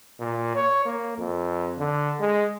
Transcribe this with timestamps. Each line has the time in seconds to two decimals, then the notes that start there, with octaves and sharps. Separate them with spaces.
0.20 A#2
0.55 C#5
0.85 A#3
1.18 F2
1.78 D3
2.20 G#3